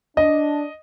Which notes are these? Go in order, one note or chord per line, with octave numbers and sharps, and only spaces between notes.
D4 D#5